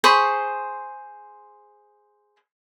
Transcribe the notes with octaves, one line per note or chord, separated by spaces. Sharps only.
G#4 C5 B5 C#6